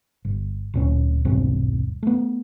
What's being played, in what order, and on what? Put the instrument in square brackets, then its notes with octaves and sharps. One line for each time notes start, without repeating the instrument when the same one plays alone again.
[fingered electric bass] G1
D1 A#2 C#4
D#1 B1 G2 C4
A3 B3